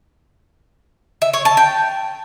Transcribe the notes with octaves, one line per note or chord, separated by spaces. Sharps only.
E5
C#5
A5
G5